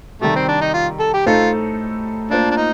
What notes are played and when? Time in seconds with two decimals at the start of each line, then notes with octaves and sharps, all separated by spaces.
0.21 C3 D#3 G3 A3
0.35 C4
0.48 D4
0.61 D#4
0.74 F4
1.00 A4
1.14 G4
1.26 A2 A3 D#4 F4 A4 C5
2.31 A#3 D4 F4 C5
2.51 D4
2.57 D#4